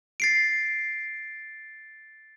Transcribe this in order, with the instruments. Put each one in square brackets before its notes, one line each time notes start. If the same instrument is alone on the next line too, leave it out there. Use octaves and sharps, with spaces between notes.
[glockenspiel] A6 C7 D7